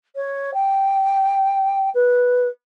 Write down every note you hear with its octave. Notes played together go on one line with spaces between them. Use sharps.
C#5
G5
B4